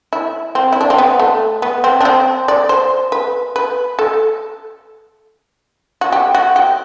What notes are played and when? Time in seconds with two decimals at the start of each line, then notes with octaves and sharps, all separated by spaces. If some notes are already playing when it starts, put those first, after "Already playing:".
0.13 E4
0.55 C4
0.73 E4
0.81 D4
0.90 C4
0.98 B3
1.20 A3
1.62 B3
1.84 C4
2.01 D4
2.05 C4
2.48 D5
2.69 C5
3.12 B4
3.56 B4
3.99 A4
6.01 F#4
6.12 G4
6.35 F#4
6.56 G4